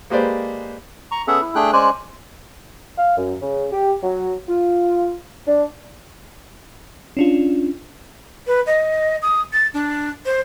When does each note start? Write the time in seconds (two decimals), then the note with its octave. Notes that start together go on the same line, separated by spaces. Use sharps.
0.10 G#3 A#3 G4 B4 C5 D5
1.11 A#5 C#6
1.28 B3 C#4 G#4 A4 E5 F#5
1.41 E4
1.55 A3 D4 G#4 G5 F#6
1.73 G#3 C#4 C5 D5 G#5 F#6
2.98 F5
3.18 F#2
3.41 C#3
3.73 G4
4.03 F#3
4.49 F4
5.48 D4
7.17 C#4 D4 F4
8.47 B4
8.66 D#5
9.22 D#6
9.52 A6
9.74 D4
10.25 C5